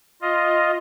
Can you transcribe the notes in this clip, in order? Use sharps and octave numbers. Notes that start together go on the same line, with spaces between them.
F4 D#5